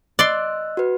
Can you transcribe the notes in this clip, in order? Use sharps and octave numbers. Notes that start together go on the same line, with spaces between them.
D5 D#5 C6 E6 F#6
F#4 B4